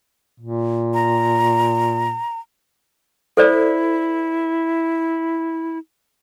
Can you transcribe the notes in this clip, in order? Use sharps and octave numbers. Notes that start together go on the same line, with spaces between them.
A#2
A#5
E4 A4 C5 D5